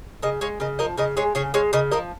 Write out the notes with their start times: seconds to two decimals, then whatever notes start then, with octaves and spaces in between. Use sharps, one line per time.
0.22 C#3 A#4 D#5
0.41 G#3 C#5 F5
0.60 C#3 A#4 D#5
0.79 F3 A#4 D#5
0.97 C#3 A#4 D#5
1.17 G#3 G#4 C#5
1.35 C#3 G#4 C#5
1.54 G#3 C#5 F5
1.73 C#3 A#4 D#5
1.91 F3 A#4 D#5